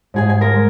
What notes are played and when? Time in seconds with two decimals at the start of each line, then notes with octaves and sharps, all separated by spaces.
0.14 G#2 G#4 G#5
0.30 G#5
0.41 A#4 A#5
0.54 G#3